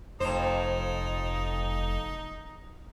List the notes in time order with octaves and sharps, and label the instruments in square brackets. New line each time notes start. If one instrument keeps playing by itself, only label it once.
[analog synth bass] F1 [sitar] F2 C5 [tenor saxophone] D#4